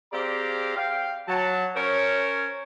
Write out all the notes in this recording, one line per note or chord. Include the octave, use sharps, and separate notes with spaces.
C4 G4 G#4 D5 F5 A#5
F5 G5
F#3 A5
C#4 A#4 C5 C#5